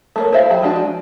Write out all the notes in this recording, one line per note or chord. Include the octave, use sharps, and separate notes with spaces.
A3 A#3 C#5
E4 C5 E5 F5
F#3 G4 B5
F3 G#3 D4 F#4
G#5